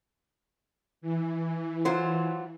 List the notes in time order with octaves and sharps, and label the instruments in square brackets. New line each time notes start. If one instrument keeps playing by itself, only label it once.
[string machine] E3
[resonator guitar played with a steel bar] F#3 F4 C5